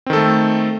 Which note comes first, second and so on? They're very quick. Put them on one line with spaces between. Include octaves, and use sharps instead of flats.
C4 D#3 A4 A3